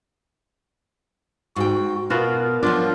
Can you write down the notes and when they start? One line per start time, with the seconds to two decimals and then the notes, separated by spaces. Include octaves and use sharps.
1.56 G#2 F#4 G5
2.10 B2 B3 F4 F#4 A#4
2.63 F3 F#3 D4 F4 D5